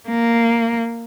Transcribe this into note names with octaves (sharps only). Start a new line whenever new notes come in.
A#3